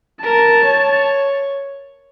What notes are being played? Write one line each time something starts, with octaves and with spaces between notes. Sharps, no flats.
A#4 A5
C#5